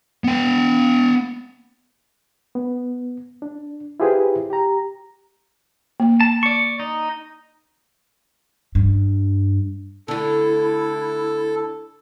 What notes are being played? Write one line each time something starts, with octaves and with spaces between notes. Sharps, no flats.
B3 G5
B3
D4
E4 F4 G4 G#4 B4 C5
G4 A#5
A#3
A5
D5 C#6
D#4
G2
D3 A3 E4 A4